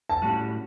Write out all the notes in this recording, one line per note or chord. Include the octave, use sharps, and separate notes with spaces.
A5
A2 G3 C#4 F#4